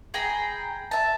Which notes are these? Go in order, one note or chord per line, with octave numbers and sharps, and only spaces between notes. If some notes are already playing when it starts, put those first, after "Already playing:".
G#4 G5 A#5 B5
E5 A5